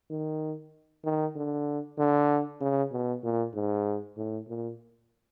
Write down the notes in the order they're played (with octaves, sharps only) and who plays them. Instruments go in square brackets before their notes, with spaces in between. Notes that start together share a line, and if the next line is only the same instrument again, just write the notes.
[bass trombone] D#3
D#3
D3
D3
C#3
B2
A#2
G#2
A2
A#2